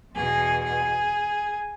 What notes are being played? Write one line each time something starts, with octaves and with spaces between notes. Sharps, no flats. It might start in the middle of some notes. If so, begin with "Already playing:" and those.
E2 B2 G#4
G#4